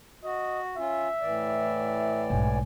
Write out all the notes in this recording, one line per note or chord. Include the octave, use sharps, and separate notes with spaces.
F#4 D#5
C#4 F4 E5
A2 E3 D5
B1 G#2 G#5